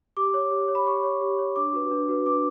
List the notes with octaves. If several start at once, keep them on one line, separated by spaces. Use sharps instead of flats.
G4 D6
C#5
G4
C#5
B5
G4 C#6
C#5
G4
C#5
D4 D6
F#4 B4
D4
F#4 B4
D4 D6